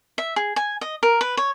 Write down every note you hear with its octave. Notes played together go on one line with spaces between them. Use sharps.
E5
G#4
G#5
D#5
A#4
B4
C#5